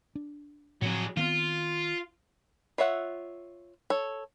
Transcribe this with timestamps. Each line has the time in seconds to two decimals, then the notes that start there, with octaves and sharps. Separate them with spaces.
0.15 D4
0.82 A2 F3 F#3 C4 G#4
1.17 D#3 B3 C4 F4
2.78 F4 C#5 E5 F#5
3.90 A4 C#5